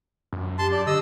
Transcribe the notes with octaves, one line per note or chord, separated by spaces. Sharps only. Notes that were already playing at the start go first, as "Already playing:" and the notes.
F#2
G4 A5 C6
D5
D3 D#5 E6